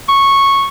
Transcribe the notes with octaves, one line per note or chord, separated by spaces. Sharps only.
C#6